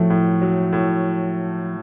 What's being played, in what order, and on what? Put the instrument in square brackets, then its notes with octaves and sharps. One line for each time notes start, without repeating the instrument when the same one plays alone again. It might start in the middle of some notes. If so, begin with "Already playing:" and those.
Already playing: [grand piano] A2 F#3 A3 [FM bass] F3
[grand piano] A2
F#3
A2